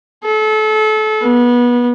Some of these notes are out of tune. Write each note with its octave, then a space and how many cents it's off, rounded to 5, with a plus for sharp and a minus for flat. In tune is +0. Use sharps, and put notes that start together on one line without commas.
A4 -30
B3 -25